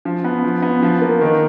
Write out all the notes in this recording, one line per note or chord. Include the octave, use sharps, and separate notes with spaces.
F3
B3
F3
B3
F3
A#3
D#3